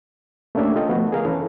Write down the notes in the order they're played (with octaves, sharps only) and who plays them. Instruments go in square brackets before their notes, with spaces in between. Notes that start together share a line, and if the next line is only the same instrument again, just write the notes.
[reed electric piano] A3 A#3 C#4 D4 G4 E5
F4 A4 D#5 G5
F3 A3 B3 F#4
G#4 A#4 F5
E3 C#4 A4 B4